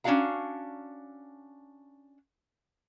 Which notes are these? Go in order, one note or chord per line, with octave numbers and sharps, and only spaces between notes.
C#4 D4 E4 F#4 F5 A#5